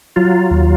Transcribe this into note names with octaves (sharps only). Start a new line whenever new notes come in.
F#3 F4
D#2